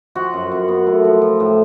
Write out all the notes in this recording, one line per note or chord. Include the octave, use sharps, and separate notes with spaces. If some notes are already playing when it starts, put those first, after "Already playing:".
F3 F#4
F#2
F#2
B3
A3
F3
F3
A2